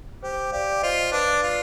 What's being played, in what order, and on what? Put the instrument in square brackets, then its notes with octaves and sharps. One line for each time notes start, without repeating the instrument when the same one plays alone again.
[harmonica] G4 [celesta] C5
[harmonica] G4 [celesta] D5 F5
[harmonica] F4 [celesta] C5 D#5
[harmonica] D4 [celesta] B4 D5
[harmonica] F4